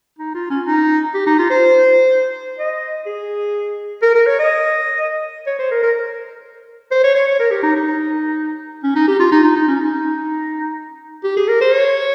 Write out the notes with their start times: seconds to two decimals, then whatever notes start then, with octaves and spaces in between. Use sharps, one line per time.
0.19 D#4
0.34 F4
0.50 C#4
0.66 D#4
1.14 G4
1.27 D#4
1.38 F4
1.50 C5
2.58 D#5
3.06 G#4
4.02 A#4
4.15 A#4
4.26 C#5
4.39 D#5
5.47 C#5
5.59 C5
5.71 A#4
5.83 A#4
6.91 C5
7.04 C#5
7.15 C#5
7.27 C#5
7.39 A#4
7.51 G4
7.63 D#4
7.76 D#4
8.83 C#4
8.95 D#4
9.07 G4
9.20 F4
9.32 D#4
9.43 D#4
9.56 D#4
9.68 C#4
9.80 D#4
11.24 G4
11.37 G#4
11.48 A#4
11.61 C5
11.72 C#5